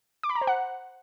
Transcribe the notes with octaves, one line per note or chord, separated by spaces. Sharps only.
D6
B5
A#5
C5
F#5